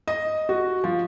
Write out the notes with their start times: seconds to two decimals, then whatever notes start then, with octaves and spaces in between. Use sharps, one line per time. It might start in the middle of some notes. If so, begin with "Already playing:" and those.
0.08 D#5
0.49 F#4
0.84 F3